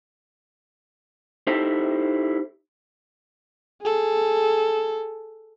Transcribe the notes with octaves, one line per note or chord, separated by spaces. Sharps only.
D#4 E4 G4 A4 C5
G#4 A4